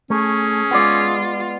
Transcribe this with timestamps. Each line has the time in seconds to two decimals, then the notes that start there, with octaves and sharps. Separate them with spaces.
0.10 A3 C#4 G#4
0.71 G#3 B3 F4 D5